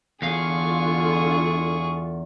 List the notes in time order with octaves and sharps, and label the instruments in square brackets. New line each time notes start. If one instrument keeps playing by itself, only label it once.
[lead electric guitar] E2 F5 [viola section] D3 F4 [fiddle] G#4 C#6